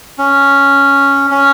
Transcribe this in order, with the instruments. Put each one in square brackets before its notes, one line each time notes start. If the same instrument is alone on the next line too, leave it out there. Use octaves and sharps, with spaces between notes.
[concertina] C#4
C#4